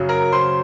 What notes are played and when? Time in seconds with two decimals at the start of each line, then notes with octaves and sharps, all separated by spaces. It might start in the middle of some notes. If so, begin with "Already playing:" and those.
Already playing: F#2 C#3 F#3
0.09 A#4 A#5
0.32 C5 C6